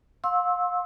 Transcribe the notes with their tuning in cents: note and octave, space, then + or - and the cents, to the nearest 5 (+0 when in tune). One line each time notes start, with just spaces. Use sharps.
F5 +35 C6 +30 E6 -15